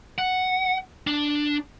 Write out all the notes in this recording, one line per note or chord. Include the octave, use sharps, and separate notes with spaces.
F#5
D4